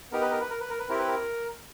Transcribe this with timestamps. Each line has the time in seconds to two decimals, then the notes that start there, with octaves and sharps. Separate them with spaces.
0.12 B3 D#4 G4 A#4
0.21 B4
0.31 A#4
0.41 B4
0.50 A#4
0.60 B4
0.70 A#4
0.79 B4
0.89 C4 E4 G4 A#4
0.99 B4
1.08 A#4